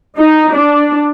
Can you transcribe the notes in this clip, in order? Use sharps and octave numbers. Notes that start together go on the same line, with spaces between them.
D#4
D4